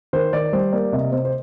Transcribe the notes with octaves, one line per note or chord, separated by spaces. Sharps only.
D#3 C5
D#3 D5
G3 C5
A#3 D5
C3 D#5
C3 C5
C5